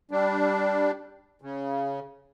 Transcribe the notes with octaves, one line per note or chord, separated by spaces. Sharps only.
G3 D4
C#3